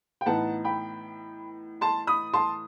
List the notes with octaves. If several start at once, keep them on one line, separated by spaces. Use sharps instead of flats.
G5
A2 E3 B3 D#4 F#5 A5
G5 B5
A5 C6
B5 D#6
A5 C6